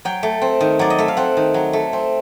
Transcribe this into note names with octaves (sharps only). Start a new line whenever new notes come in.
F#3 G5
A3
C4
D#3
F#3 D5
D#5
A3 E5
F5
C4 F#5
D#3
F#3
A3
C4